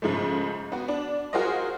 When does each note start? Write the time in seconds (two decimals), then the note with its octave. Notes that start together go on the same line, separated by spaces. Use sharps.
0.02 G#2 C#3 F3 G#3 A3
0.72 B3 F#4
0.88 D4
1.33 F4 F#4 G#4 A#4 C5 D#5